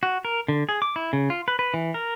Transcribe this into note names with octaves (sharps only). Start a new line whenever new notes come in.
F#4
A#4
D3
G#4
D6
E4
C#3
F4
B4
B4
E3
A#4